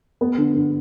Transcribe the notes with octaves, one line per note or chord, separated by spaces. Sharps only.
B3
D3
D3